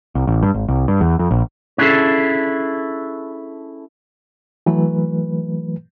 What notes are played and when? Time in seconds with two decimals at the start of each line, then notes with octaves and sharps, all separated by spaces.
0.15 C2
0.27 A1
0.43 G2
0.54 G#1
0.68 C2
0.88 G2
1.01 E2
1.19 F2
1.31 A#1
1.78 C#4 D4 E4 G#4 A4
4.66 E3 F#3 A3 B4